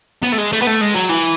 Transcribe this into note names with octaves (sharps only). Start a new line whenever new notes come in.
B3
A3
G#3
A3
B3
A3
G#3
F#3
E3